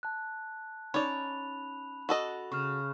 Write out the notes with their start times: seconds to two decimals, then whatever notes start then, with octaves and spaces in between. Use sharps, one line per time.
0.03 A5 F#6
0.94 C#4 D#4 C#5 D5 A5 B5 F7
2.09 F#4 A4 D#5
2.52 C#3 C#6 F6